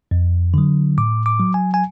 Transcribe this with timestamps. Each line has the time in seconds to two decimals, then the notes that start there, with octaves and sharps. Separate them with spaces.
0.11 F2
0.54 D3 F#3
0.98 A2 D6
1.26 D6
1.40 F#3
1.54 G#5
1.74 G#5